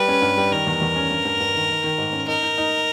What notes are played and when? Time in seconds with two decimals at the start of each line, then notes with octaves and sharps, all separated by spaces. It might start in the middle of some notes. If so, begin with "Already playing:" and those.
Already playing: G3 B4
0.08 C#4
0.22 G2
0.38 G3
0.52 D#3 A#4
0.67 E2
0.82 E2
0.96 C#4
1.10 G2
1.25 G2
1.40 G2
1.55 D#3
1.70 D#3
1.84 D#3
1.98 G#2
2.13 C#4
2.28 D#4 A#4
2.43 D#4
2.58 D#4